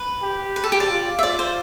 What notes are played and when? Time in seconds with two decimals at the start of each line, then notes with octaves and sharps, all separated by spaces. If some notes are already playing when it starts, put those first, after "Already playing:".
Already playing: B4
0.22 G4
0.56 B4
0.64 A4
0.72 G4
0.80 D5
0.89 F4
1.19 E5
1.22 F4 D5
1.39 C5